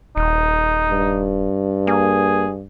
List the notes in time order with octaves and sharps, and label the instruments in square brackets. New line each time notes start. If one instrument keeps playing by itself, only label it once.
[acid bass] D#1 [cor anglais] D#4
[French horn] G2
[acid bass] A#3 [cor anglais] G#4